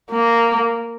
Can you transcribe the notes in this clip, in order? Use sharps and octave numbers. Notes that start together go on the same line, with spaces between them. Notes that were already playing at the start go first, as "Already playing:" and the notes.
A#3